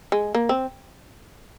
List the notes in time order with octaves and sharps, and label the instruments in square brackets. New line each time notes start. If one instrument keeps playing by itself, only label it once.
[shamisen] G#3
A#3
C4